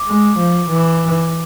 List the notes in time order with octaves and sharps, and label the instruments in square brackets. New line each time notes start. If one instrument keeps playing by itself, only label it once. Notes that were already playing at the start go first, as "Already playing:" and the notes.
Already playing: [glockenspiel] D6
[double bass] G#3
F3
E3